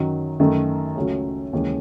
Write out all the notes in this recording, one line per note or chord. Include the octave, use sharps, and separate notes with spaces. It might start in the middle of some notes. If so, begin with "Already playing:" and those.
Already playing: F#2 D#3 F#3
F#2 D#3 A3
C#2 C#3 F#3 A3 C#4
D#2 C#3 E3 G#3 C#4